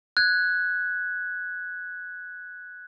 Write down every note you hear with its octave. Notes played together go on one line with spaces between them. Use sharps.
F#6 G#6